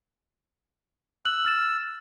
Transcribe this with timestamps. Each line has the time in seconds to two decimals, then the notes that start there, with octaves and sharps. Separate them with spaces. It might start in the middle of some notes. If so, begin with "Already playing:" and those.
1.25 E6 F#6 F#7
1.45 F6 A6 E7